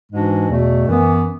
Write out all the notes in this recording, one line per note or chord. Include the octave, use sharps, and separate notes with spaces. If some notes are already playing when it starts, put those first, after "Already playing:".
G#2 E3 G#3 D4 F#4
E2 B2 A3
F#2 E3 B3